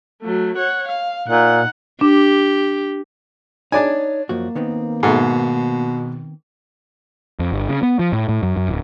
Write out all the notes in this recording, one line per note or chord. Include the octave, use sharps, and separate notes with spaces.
F#3 A3
C#5 F#5
F5
A#2 D#4 F#5
D4 G4
D4 D#4 C#5 D5 G#5
F#2 F3 A#3 F#4
D#3 B3 C4
G#2 B2 A3
F2
G1
C#3
B3
F3
A2
A2
F#2
F#2
D1